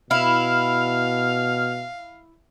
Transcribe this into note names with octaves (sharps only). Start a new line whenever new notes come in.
B2 E4 F5 F6